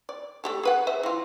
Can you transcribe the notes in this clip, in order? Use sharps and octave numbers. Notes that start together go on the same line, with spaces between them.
D5
A3 G4 A4
G#4 B4 F#5
B4 C5 E5
E3 F4